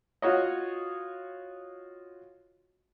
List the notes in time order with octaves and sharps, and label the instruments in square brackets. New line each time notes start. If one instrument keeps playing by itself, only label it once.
[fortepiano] F4 F#4 C#5 D#5